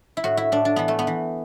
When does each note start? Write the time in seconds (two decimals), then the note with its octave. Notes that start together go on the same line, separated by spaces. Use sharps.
0.17 E4
0.24 A2 F#4
0.37 E4
0.52 A2 D4
0.65 D4
0.76 E3 B3
0.88 A3
0.99 B3
1.07 E3